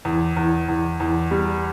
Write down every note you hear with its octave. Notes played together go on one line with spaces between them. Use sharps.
E2
E2
E2
E2
G3